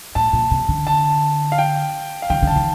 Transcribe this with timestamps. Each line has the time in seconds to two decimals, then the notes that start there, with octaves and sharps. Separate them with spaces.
0.15 A2 A5
0.33 A#2
0.51 C3
0.69 D3
0.87 A5
1.52 F5
1.58 G5
2.22 F5
2.30 D#3 G5
2.42 D3 A5
2.56 D#3